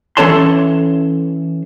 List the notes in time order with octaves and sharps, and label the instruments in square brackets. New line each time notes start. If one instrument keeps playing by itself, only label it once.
[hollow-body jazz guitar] E3 C#4 A4 C#5 A5 C6